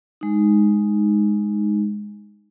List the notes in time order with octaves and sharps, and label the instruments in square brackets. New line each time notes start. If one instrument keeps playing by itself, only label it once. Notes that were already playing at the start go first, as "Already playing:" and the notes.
[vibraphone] G#3 D#4